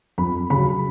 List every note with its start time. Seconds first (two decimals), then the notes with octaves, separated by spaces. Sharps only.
0.18 F2 B5
0.50 C#3 F#3 B5